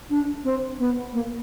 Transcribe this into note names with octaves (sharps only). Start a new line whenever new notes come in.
D4
C4
B3
A#3